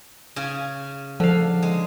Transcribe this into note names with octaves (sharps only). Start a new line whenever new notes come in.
C#3 C#4 G#5
D3 F3 F5
G#3